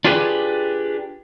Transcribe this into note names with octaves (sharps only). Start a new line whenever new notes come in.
D4 F4 G4 G#4 B4